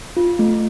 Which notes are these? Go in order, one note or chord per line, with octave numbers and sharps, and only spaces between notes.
F4
A3